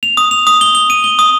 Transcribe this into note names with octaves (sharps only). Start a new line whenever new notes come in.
F7
D#6
F7
D#6
G7
G7
D#7
G7
D#6